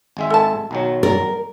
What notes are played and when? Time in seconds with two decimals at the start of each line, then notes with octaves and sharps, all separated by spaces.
0.17 G#1 G#3 E5
0.30 A4 A5
0.71 B1 D#3 F#3
1.03 A#4 D5